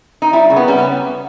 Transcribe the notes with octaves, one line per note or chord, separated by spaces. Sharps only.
D#4
G3 E4
C#3
B3
G3 C#4
B3